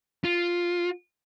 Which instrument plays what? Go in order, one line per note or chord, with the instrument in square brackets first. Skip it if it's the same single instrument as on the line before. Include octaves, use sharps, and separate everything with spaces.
[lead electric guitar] F4